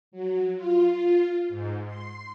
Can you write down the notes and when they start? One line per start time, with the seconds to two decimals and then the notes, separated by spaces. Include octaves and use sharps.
0.11 F#3
0.55 F4
1.49 G#2
1.85 C6